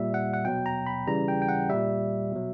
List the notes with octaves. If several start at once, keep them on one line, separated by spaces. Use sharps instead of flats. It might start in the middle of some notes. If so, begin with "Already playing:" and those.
Already playing: A#2 G3 E5
F#5
F#5
B2 F#3 G5
A#5
B5
C#3 E3 G3 A#5
G5
G5
F#5
A#2 G3 E5
B2 F#3